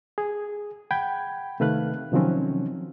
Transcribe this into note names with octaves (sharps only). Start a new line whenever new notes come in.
G#4
F#5 G5 B5 G6 G#6
C3 D#3 A3 B4 F5 F#6
C3 D#3 F3 F#3 C4 C#4